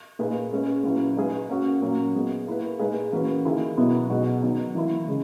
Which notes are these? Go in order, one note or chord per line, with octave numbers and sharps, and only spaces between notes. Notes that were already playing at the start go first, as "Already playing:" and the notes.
A#2 A#3 D#4 G#4 B4
G#3 C#4 G#4 B4
A#2 F#3 C#4 E4 B4
G#3 D#4 G#4 B4
A#3 C#4 F#4
A#2 F#3 A#3 C#4
G#3 B3 F#4
A#3 E4 G#4 B4
A#2 G#3 D#4 G#4 B4
E3 A#3 C#4 F#4 B4
D#3 A#3 E4 G#4
B2 F#3 B3 E4
B2 G#3 B3 D#4 F#4
D#3 F#3 B3 D#4
E3 A#3 E4 A#4
C#3 G#3